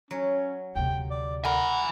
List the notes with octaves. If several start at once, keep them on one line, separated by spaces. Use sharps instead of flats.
F#3 C#4
D2 C3 G5
D5
A#4 F#5 G#5 B5